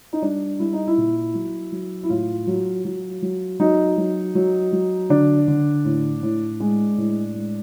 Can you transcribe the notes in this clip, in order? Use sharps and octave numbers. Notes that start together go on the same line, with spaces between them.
D#4
G3 D4
G3 E4
D#4
E4
A#2
F#3
F#3
E4
A2 F4
F#3
F#3
F#3
F#3 D#4
F#3
F#3
F#3
D3 D4
D3
A2
A2
G#3
A2
G#3